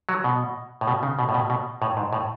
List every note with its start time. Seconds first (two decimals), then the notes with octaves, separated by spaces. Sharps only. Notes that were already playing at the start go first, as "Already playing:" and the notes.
0.09 F#3
0.24 B2
0.81 A2
0.87 B2
1.03 C#3
1.19 B2
1.29 A2
1.34 B2
1.50 B2
1.82 A2
1.97 G#2
2.13 A2